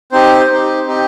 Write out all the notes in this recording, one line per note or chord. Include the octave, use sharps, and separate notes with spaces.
C4 D#4 G4 C5
C4 D#4 G4
C4 D#4 G4